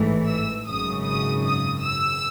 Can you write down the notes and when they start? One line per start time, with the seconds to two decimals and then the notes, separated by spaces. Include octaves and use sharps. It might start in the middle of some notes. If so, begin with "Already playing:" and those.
Already playing: A1 G#2 E3 A3
0.27 E6
0.66 G#1 F#2 C#3 D#6
1.04 D#6
1.43 D#6
1.81 E6